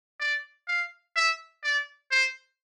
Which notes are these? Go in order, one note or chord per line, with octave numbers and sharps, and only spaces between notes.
D5
F5
E5
D5
C5